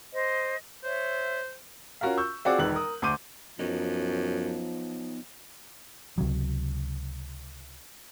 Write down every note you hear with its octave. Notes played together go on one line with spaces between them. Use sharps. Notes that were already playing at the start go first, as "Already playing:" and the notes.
C5 D#5
C5 C#5 E5
C#4 F4 F#4 A#4 F5
C#6 E6 G6
C4 F4 F#4 G#4 D5 F#5
E1 D#3 B4 F#6 F#7
A#4 D#6
D2 C6 D6 G6 D#7
F#2 F3 B3 D#4
C#2 C3 F#3